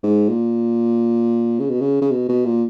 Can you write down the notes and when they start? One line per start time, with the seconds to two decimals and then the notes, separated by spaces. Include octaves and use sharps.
0.04 G#2
0.29 A#2
1.60 C#3
1.70 B2
1.81 C#3
2.02 C#3
2.11 B2
2.29 B2
2.46 A#2